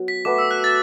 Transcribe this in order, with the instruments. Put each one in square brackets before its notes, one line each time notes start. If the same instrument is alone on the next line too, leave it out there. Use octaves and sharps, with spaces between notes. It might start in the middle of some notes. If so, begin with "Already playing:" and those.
Already playing: [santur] F#3 B3
[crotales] B6
[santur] A3 F#4 B4 E5 [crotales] D6
[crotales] E6
F#6
A6